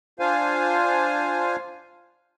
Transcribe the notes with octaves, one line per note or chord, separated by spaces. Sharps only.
D4 F4 C5 F5 G#5